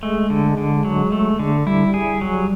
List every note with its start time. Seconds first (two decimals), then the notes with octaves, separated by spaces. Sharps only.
0.03 G#3 A3
0.30 D3
0.58 D3
0.85 F#3
1.12 A3
1.39 D3
1.67 G3 E4
1.94 G#4
2.21 F#3